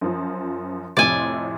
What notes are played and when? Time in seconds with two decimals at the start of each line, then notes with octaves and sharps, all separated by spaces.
0.01 F#2 F3
0.97 F2 A2 C3 D5 G#5